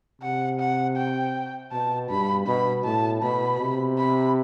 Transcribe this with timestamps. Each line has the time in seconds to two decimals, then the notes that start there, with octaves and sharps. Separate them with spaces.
0.22 C3 F#5
0.60 F#5
0.96 G5
1.72 B2 A5
2.10 G2 B5
2.47 B2 B5
2.84 A2 A5
3.22 B2 B5
3.60 C3
3.98 B5